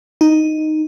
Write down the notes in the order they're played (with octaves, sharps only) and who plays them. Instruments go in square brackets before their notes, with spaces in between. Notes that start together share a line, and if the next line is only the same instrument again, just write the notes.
[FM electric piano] D#4